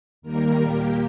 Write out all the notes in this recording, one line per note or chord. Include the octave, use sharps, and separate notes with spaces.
D#2 D#3 G3 A#3 A#4
A#2 A#3 G4